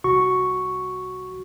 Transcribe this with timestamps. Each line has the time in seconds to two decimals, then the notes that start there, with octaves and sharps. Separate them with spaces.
0.04 C2 F#4 C#6